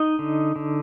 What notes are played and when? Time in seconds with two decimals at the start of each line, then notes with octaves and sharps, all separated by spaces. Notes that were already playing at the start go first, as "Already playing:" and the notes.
Already playing: D#4 D#5
0.19 D3
0.56 D3